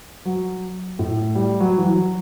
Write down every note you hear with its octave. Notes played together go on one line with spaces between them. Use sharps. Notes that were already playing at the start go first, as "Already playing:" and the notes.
F#3
A2
G3
F#3
E3
F#3